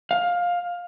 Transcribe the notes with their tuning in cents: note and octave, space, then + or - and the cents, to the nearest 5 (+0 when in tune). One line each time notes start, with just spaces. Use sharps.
F5 +15